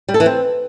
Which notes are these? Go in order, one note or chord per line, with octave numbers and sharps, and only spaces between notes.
G3
A4
E3
C4